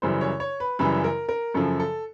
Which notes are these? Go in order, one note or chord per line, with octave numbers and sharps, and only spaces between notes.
F#2 C#3 E3 G3 C5
C#5
C#5
B4
F#2 C#3 E3 G3 B4
A#4
A#4
F#2 C#3 F3 A4
A4